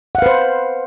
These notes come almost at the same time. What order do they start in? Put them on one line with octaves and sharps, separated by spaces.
F#5 F5 B4 C5